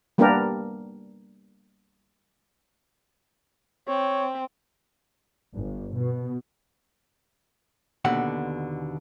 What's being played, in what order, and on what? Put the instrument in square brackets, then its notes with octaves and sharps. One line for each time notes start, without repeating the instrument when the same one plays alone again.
[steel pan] G3 A#3 B3 D4 G4 A#4
[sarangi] C4 [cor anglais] C#5
[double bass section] G1
B2
[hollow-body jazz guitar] D#2 B2 D3 F#5